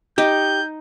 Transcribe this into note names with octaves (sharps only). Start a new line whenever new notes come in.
D#4 G4 D#5 G6